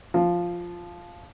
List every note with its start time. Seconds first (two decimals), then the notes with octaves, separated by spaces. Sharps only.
0.14 F3